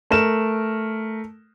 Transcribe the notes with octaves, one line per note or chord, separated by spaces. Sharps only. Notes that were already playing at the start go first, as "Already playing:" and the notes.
A3 A#4 E7